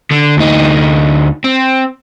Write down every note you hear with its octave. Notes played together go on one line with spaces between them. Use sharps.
D3
D2 D#4
C4